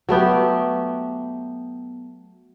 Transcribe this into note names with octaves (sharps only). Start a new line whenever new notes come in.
F#3 A3 B3 G4